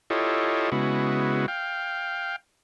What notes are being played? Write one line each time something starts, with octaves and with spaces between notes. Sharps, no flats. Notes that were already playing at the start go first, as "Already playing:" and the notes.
E4 F4 G4 A4 C#5 D#5
C#3 G#3 B3 E4 F#4
F5 G5